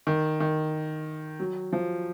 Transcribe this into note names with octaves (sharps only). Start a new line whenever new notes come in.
D#3
D#3
F#3
F3